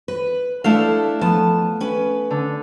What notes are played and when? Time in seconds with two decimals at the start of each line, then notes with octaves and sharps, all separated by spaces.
0.08 B4
0.64 A3 D4 E4 A4 F5
1.21 F3 B3 A5
1.80 C#4 B4
2.30 D3